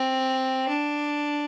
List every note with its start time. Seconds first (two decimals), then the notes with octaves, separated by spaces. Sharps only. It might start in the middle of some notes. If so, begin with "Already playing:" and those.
Already playing: C4
0.68 D4